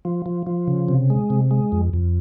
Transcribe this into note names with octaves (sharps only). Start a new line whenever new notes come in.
F3
F3
F3
C#3
C3
G#3
C3
G#3
F2
F2